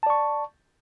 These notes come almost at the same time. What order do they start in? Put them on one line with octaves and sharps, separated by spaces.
A5 D5 C#6